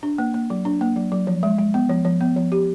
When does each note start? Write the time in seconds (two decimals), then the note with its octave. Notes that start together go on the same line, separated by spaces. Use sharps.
0.03 D4
0.18 A#3
0.34 A#3
0.50 F#3
0.65 D4
0.81 A#3
0.96 F#3
1.12 F#3
1.27 F3
1.43 G#3
1.59 G#3
1.74 B3
1.90 F3
2.05 F3
2.21 B3
2.36 F3
2.52 G4